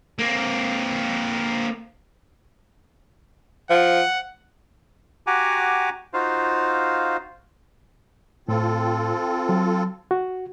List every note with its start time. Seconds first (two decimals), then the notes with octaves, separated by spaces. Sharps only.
0.19 A#3 C4
3.70 F3 F#5
5.27 F#4 G4 F#5 G#5 A#5 D6
6.14 D#4 F4 F#4 C5 F5
8.48 A2 C4 F4 A4
9.49 F#3
10.11 F#4